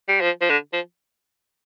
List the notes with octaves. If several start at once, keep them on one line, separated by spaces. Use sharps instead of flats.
G3
F3
F3
D3
F3